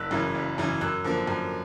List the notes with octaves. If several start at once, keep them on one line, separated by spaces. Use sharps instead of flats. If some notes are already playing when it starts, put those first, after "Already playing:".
Already playing: F#1 E6 F#6
F#2 C#3 E3
F#1
F#2 C#3 E3
F#2 E6 F#6
D3 F3 A#3
F#2